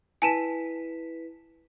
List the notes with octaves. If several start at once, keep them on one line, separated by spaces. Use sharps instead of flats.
E4 B4 G#5 A5 B6 E7